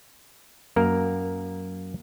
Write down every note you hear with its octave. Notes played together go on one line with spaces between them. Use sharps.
F#2 A#3 A#4